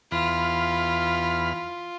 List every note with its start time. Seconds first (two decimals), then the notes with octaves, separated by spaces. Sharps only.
0.12 E2 F4 B5 F6